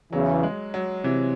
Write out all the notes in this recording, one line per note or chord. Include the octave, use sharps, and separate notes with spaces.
E2 C#3 E3 F#3
G#3
F#3
C3 E3